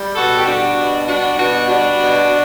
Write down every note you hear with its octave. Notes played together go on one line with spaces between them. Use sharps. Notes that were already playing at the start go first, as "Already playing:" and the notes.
Already playing: G3
B2 F#4 A4
G4
G3 D4 F#4
B2
G3 D4 F#4
B2 D4 F#4
G3 D4 F#4
B2
B2